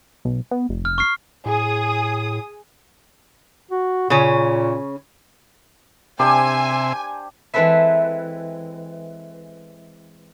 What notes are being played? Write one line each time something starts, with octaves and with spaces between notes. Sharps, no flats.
B1
B3
F1
F6
C#6 F6 C7
A2 G#4 D#6
F#4
A#2 C#3 C#4
C3 D4 G4 C5 E5 G#5 C6
E3 G#3 C4 A4 B4 E5